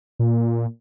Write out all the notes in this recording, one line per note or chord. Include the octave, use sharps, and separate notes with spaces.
A#2